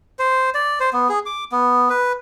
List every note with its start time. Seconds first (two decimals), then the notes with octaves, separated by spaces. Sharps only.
0.19 C5
0.55 D5
0.80 C5
0.93 B3
1.09 G#4
1.26 D6
1.52 B3
1.90 B4